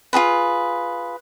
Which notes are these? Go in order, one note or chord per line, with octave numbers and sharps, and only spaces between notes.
F4 F#4 G#4 B4